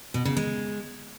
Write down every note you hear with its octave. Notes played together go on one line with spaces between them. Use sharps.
B2
C#3
G#3